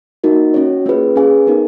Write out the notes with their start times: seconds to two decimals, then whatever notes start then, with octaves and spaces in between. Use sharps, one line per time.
0.24 A#3 D#4 F#4 A#4
0.54 C#4 F#4 C#5
0.86 A#3 C#4 F4 G#4 B4
1.16 C#4 G#4 B4 F5 G#5
1.47 B3 D#4 A#4